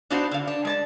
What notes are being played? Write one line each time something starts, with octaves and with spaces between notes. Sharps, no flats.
B3 D4 D#4 F4 F#4 C5
D3 F5
D4
G#3 D5 A5